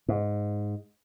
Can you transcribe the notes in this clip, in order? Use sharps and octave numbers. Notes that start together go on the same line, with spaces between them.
G#2